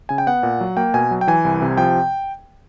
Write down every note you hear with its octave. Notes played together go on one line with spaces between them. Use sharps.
C#3 G#5
G5
B3 F#5
A#2
F#3
A#3 G5
B2 G#5
F#3
G5
E3 G#5
C2
C3
F3 G5